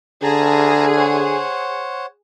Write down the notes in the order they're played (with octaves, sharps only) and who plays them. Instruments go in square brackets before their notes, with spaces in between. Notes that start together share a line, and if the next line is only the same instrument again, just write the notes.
[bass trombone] D3 [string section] G#4 [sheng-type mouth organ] A5 A#5
[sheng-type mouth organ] C5 C#5 F#5